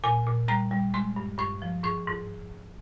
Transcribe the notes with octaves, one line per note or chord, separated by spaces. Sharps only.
A#2 G#5
A#2
G3 A#5
G3
G#3 C6
G2
G2 C#6
F3
G#2 C#6
G#2